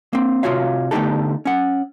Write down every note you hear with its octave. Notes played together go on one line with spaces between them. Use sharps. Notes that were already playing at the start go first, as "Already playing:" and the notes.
A#3 C4
C3 F4 F#4 C#5 F5
D3 A3 B3 D#4 G4 A4
C#4 F#5